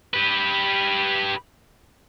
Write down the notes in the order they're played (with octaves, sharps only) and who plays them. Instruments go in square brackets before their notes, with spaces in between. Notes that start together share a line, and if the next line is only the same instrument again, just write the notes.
[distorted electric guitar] G4 B4